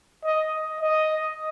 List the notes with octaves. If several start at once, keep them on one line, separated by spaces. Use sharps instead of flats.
D#5
D#5